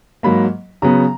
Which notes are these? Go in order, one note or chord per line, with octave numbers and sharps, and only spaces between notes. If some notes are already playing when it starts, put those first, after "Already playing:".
G#2 F#3 A#3 B5
C#3 F#3 B3 A#5